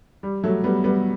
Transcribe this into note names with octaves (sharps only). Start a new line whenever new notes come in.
G3
F#3 A3
G3 B3
G3 B3